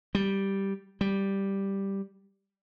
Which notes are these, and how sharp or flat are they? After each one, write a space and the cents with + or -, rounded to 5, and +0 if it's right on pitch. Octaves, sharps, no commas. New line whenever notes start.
G3 -5
G3 +0